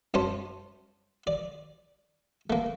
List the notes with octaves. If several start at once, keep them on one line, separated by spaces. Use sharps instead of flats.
F#2 C#4 C5 A5
D5
A3 A#3